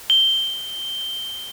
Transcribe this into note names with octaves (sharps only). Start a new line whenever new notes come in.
G7